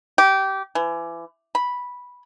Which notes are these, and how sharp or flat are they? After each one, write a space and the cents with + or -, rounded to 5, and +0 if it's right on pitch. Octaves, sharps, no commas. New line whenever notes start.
G4 -20
E3 +30
B5 -5